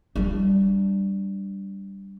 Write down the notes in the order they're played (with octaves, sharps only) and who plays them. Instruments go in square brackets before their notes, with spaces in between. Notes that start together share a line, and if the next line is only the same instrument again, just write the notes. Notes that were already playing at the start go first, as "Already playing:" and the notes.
[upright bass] G3 D4